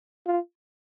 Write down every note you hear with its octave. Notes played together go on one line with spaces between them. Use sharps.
F4